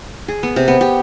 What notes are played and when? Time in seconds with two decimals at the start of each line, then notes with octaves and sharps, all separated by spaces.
0.28 G#4
0.43 B3
0.56 C3
0.68 B3
0.81 G4